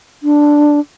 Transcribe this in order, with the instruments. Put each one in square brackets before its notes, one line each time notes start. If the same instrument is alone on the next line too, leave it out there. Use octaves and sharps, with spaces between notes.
[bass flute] D4